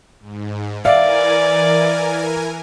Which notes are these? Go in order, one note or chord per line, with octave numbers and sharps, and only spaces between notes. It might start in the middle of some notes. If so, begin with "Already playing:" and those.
G#2
E3 A#4 D5 E5 F5 G#5